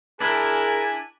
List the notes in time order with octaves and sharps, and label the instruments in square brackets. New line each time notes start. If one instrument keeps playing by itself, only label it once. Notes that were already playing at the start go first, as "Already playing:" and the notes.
[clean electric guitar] D4 E4 [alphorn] G#4 [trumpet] A#4 [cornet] G#5